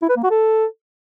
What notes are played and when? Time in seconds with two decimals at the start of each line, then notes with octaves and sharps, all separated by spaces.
0.02 E4
0.09 B4
0.16 A#3
0.23 F#4
0.31 A4